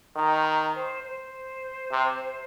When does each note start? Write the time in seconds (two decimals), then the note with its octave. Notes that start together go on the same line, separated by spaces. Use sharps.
0.16 D#3 A#5
0.42 C6
0.45 A#5
0.75 C5
1.04 C5
1.92 C3